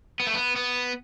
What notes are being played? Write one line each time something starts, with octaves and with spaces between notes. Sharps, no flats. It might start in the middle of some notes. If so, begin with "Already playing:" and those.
B3
A3
B3
B3